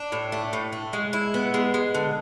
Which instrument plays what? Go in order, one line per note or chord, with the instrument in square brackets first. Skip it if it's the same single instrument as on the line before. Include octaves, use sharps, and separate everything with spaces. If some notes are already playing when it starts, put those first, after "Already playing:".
Already playing: [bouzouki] D4
A2
A3
A2
A3
G#3
E4
B3
G#3
G#3
D3